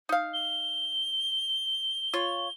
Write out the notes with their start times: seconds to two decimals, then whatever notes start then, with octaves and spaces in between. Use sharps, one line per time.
0.09 D#4 F5
0.33 G7
2.13 F4 C#5